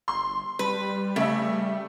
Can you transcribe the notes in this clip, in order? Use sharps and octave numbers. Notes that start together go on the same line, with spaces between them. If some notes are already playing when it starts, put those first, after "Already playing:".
G1 C6
G3 B4
C#3 A3 E5